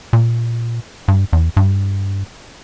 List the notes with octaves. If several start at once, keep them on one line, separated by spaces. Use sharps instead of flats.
A#2
G2
E2
G2